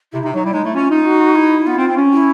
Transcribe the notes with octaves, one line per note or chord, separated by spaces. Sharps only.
C3 E4
C3 D#4
F#3 D#4
G3 E4
G#3 D#4
A3 E4
C#4 F4
D#4
F#4
E4
B3 F4
C4
C4
C#4
E4